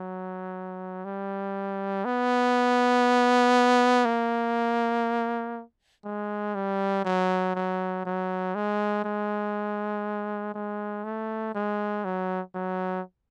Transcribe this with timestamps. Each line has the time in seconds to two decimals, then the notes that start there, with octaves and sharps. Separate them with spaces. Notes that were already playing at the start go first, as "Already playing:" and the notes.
Already playing: F#3
1.05 G3
2.05 B3
4.05 A#3
6.05 G#3
6.55 G3
7.05 F#3
7.55 F#3
8.05 F#3
8.55 G#3
9.04 G#3
10.54 G#3
11.04 A3
11.55 G#3
12.05 F#3
12.55 F#3